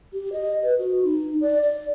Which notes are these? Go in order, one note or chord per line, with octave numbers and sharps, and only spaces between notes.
G4
D#5
B4
F#4
D#4
D5
D5